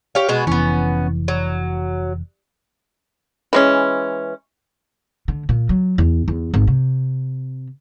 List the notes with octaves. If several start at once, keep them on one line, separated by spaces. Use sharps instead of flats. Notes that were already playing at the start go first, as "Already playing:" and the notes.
G4 C#5 F5
B2 G#3 F#4
F1 E3 B3 C#4
F#3
E3 G#3 C#4
D3
A#2
F#3
E2
E2
G#1
C3